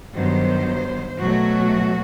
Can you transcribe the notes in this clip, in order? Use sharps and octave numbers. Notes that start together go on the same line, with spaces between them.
G2 D#3 F#3 B3 C5
B2 F#3 A3 F#4